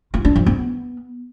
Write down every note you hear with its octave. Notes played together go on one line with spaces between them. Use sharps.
F4
D4
F3
B3